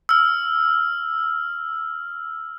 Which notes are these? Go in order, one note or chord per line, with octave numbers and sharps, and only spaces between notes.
E6 F6